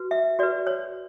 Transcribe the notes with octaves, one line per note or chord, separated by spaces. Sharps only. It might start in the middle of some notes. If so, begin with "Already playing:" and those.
Already playing: F#4 B4
E5
F#4 B4 D5
C#5